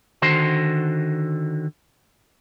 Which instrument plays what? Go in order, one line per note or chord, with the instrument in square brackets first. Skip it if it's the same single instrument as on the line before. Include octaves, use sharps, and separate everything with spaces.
[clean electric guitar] D3 D#3 F#4 C5 C6